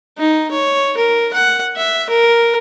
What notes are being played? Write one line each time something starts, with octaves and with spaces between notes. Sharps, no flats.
D#4
C#5
A#4
F#5
E5
A#4